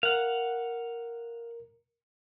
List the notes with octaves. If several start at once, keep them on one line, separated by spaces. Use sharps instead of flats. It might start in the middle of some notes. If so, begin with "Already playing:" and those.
A#4 F5 F#5